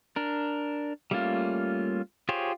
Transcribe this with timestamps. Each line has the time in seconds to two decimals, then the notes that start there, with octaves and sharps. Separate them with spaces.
0.16 D4 A#4
1.11 G3 A3 A#3 C#4 F4
2.29 F4 G4 G#4 C5 C#5